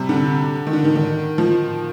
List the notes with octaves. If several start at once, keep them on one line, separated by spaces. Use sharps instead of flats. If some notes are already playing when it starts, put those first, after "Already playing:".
Already playing: C3 G3
D3
D#3
D3
D#3
D#3
F3